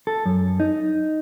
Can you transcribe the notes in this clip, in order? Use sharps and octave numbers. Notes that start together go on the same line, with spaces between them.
A4
F#2
D#4